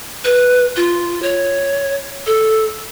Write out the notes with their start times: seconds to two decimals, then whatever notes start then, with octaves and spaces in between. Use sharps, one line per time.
0.25 B4
0.76 F4
1.23 C#5
2.26 A4